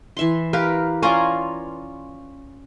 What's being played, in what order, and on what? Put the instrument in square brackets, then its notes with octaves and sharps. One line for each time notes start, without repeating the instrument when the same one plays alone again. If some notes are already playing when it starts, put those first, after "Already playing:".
[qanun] E3 E5 C6
[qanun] G4 A#4 [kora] B4 F5
[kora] C#4 F4 D5 [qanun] G#5 A#5 C6